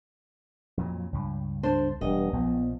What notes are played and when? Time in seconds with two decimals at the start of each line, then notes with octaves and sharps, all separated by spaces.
0.77 F2 A#2 F#3
1.13 C#2 G2
1.63 D4 C5
2.01 E1 G2 D#5
2.33 A#1 F3 B3